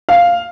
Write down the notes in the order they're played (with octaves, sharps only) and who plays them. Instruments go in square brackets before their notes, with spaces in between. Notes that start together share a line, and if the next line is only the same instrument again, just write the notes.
[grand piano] F5